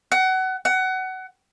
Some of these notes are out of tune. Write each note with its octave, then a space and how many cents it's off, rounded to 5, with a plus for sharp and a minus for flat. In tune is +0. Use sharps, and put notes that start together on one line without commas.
F#5 +25
F#5 +20